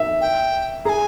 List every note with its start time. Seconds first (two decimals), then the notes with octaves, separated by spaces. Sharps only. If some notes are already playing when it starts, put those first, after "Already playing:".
Already playing: E5
0.21 G5
0.85 G#4 G#5 A#5